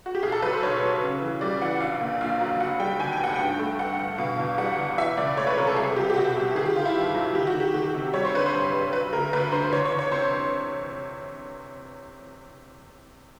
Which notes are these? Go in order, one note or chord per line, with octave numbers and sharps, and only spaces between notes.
F#4
G4
B1 G#4
A4
F#3 B4
C5
B1 C#5
F#3
C#3
E3
G3 D5
E3 F#5
A#1 F5
A#2
A#1 F5
F#3
F1 F#5
G3 G5
D#2 G#5
G5
F1 F#5
G2 G5
A3
G2 F#5
G2
B2 F5
E2
G3 F#5
E2
E3 E5
C#2 D5
A3 C#5
B4
C3 A#4
A4
C2 G#4
C2 G4
G4
B2 F#4
C2
G4
D#3 G#4
G4
D#3 F4
E4
G1
F#3
D#3 G4
F#4
D#3
G4
D#3 G4
C3
G3 C#5
C5
D3 B4
C5
G2
G3
F#3 B4
D2 A#4
D2 B4
D3 C5
E2 C#5
C#5
E2
C#5
C3 C5